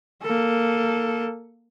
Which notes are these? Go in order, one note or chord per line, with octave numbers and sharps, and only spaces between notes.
A#3 A4